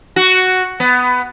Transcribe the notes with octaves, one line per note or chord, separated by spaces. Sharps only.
F#4
B3